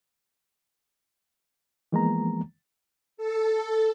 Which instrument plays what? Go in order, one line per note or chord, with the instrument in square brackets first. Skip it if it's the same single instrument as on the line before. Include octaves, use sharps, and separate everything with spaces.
[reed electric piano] E3 F3 G#3 A#3 B3 A#5
[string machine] A4